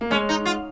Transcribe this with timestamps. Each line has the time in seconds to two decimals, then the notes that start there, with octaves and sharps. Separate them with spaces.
0.01 A#3
0.10 G#3 C#4
0.29 D#4
0.45 F4